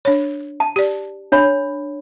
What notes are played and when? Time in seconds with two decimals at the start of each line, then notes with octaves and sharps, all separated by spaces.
0.05 D4 C#5
0.60 A5
0.76 G4 D5
1.32 D4 C#5 B5